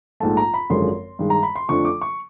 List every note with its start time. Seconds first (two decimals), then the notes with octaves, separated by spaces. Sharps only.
0.20 A#1 G#2 F3 A3 A5
0.37 A#5
0.54 B5
0.70 G#1 F#2 D3 F3 G#3 C6
1.19 G2 D#3 G#3
1.30 A#5
1.43 B5
1.56 C6
1.68 F2 D3 F3 A3 D4 C#6
1.85 D6
2.02 C#6